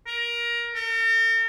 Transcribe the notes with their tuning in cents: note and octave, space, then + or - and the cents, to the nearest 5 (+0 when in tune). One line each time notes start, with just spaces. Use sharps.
A#4 +20
A#4 -45